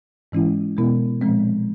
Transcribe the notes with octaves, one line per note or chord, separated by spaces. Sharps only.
G#2 E3 G#3 C#4 E4
B2 G#3 B3 E4
A#2 F3 G#3 C4